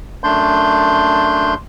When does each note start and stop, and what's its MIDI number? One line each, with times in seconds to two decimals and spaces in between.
0.24 1.54 42
0.24 1.54 57
0.24 1.54 62
0.24 1.54 84
0.24 1.54 91